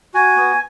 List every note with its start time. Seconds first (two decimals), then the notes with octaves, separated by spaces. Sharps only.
0.14 F#4 G#5
0.36 B3